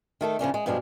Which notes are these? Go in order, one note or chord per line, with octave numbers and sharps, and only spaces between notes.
D#3 A3 A4
C#3 F3 C#4 D4
G#3
G2 B2 F3 G#3 D4